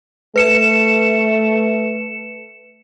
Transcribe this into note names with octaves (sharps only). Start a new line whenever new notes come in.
A3 B4 C#7 E7